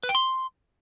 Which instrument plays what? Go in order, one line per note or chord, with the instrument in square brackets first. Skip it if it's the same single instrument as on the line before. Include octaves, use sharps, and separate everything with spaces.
[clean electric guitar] B4
G5
C6